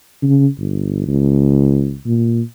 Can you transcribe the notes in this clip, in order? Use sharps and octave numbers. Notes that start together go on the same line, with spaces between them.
C#3
G1
C#2
A#2